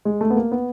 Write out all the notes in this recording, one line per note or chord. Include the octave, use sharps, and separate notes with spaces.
G#3
A3
B3
A#3
B3